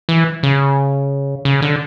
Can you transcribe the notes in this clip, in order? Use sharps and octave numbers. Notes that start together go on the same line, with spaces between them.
E3
C#3
C#3
D3